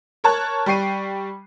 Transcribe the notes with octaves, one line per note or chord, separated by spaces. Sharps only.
A#4 C#5 A5 C#6 F#6
G3 G5 C#6 C7 D#7